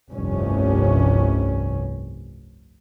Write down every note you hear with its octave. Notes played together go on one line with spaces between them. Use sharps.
F1 C2 G2 C#4